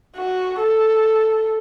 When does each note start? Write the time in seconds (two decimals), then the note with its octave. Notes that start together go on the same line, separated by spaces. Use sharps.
0.16 F#4
0.59 A4